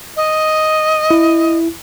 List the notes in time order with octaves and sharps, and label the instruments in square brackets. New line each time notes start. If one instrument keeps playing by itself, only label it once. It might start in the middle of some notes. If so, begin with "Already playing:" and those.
[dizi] D#5
[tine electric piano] E4